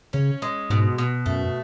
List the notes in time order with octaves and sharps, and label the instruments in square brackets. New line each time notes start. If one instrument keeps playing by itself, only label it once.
[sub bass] C#3 [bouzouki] C#4
[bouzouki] G#3
[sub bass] G#2 [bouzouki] B2
[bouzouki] B2
[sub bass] F#2 [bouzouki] A3